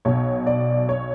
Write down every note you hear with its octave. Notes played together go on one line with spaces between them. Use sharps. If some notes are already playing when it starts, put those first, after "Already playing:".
B1 B2 C#5
D5
C#5